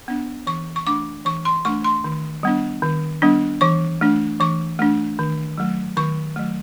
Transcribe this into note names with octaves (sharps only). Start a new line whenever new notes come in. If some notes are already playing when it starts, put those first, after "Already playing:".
B3 D4
E3 C#6
C#6
A3 D4 D6
E3 C#6
C6
A3 D4 C#6
C6
D#3
G3 B3 D4
D#3
G3 B3 D4
E3 C#6
A3 D4
E3 C#6
A3 D4
D#3
F#3 A3
D#3 C#6
F#3 A3